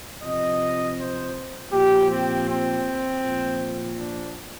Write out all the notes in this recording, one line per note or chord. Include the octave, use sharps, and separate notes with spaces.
C3 F3 D#5
C5
A#2 F3 G4
C4
C4
A#2 F3
D4